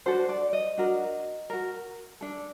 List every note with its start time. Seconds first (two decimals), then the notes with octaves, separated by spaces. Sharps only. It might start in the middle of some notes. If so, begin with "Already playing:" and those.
0.06 D4 F#4 A4 C5
0.29 D5
0.53 D#5
0.78 D4 F#4 A#4
1.50 F#4 A#4
2.21 D4 A4